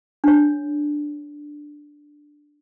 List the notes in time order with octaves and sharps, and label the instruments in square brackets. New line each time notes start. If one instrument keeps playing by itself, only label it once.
[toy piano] D4 C#5